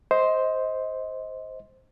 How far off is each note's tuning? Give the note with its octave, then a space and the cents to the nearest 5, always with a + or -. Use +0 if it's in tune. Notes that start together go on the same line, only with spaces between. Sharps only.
C5 +0 D#5 +25